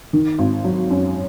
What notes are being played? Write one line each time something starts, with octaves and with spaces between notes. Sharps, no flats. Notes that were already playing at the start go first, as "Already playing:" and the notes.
D#3
G#1
F#3
F#2